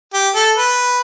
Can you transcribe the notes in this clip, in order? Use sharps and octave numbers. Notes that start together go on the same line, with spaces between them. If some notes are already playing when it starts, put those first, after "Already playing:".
G4
A4
B4